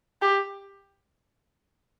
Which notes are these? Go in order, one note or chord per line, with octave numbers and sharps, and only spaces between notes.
G4